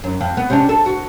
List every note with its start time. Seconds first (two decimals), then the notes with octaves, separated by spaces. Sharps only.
0.04 F#2
0.21 F2
0.37 B3
0.50 C3 C#4 D4
0.69 A4
0.86 F#4